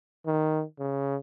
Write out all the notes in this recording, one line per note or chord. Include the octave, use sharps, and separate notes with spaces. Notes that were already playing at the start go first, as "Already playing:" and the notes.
D#3
C#3